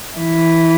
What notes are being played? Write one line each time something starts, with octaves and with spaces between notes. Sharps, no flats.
E3